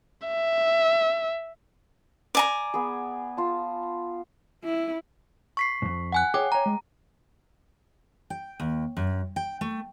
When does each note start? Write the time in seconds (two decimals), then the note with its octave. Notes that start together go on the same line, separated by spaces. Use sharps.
0.27 E5
2.35 D5 G#5 A#5
2.74 B3 G#4
3.37 F4 A5
4.64 E4
5.57 C#6 B6 C7
5.82 F2 G#2
6.12 F#5 G#5 F#6
6.34 G#4 C#5 G5 D6
6.52 C#5 G#5 A#5
6.66 G#3
8.30 G5
8.60 D#2
8.97 F#2
9.36 G5
9.61 A3